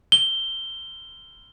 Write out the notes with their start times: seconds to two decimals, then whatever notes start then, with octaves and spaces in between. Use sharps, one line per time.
0.12 G7